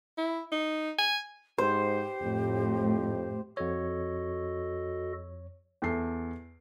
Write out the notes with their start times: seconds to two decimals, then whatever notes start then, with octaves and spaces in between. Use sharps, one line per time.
0.18 E4
0.52 D#4
0.98 G#5
1.58 G#2 G4 C5
2.22 F2 A2
3.57 F2 F#4 A4 C#5 D#5
5.82 E2 A4 C7